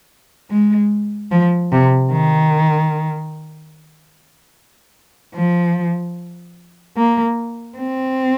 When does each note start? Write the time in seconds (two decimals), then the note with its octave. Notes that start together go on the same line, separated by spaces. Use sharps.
0.51 G#3
1.31 F3
1.72 C3
2.12 D#3
5.35 F3
6.97 A#3
7.78 C4